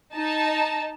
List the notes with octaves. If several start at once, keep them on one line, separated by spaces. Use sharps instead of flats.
D#4 A5